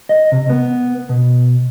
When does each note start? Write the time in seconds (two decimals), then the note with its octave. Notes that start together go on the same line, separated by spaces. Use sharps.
0.09 D#5
0.32 C3
0.50 B3
1.09 B2